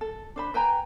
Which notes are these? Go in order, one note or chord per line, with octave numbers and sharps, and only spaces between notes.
A4
D4 C5 B5
B4 G5 G#5 A#5